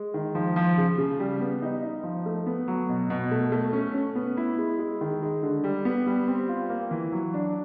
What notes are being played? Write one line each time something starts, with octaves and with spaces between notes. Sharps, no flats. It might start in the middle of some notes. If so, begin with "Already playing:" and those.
Already playing: G#3
D#3
F3
F3
C#3
C#3
G3
B3
D#4
D#4
F3
A3
B3
F#3
B2
B2
A3
A3
C#4
C#4
B3
E4
G#3
G#3
D#3
G#3
D3
G3
B3
G3
C4
F4
A#3
E3
F#3
D4